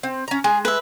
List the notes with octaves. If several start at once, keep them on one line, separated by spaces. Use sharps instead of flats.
C4
C#4 A#5
G#3 G#4
B4 E5